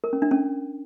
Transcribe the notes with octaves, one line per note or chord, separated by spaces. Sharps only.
A#4
C#4
D4
C#4